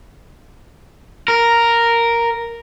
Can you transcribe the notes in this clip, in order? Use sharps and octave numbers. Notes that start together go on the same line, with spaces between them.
A#4